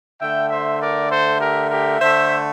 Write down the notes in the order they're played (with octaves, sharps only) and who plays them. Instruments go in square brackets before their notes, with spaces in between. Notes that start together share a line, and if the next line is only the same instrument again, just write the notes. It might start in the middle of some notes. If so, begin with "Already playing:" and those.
[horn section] D3 A3 E5 G5
C5 E5
A#4 D5
A4 C5
G4 A#4
G4 A#4
D3 A3 C5 E5